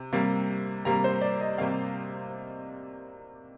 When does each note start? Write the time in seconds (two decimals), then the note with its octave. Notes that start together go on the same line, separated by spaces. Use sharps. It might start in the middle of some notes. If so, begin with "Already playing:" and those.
Already playing: C3
0.13 C3 G3 A#3
0.85 C3 G3 A#3 A#5
1.04 C5
1.21 D5
1.41 D#5
1.58 C3 G3 A#3 F5